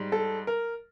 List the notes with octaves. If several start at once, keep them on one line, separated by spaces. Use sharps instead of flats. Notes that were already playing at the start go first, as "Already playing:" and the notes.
Already playing: G#2 G3
A4
A#4